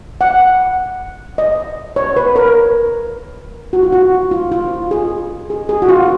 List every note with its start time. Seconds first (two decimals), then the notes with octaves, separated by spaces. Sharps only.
0.21 F#5
1.38 D#5
1.96 C#5
2.17 B4
2.36 A#4
3.73 F#4
3.83 F4
3.93 F#4
4.31 F4
4.52 F4
4.91 G#4
5.50 G#4
5.69 G#4
5.82 F#4
5.88 F4